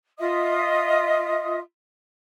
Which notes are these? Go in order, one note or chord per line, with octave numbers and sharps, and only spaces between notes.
F4 D#5 E5 D#6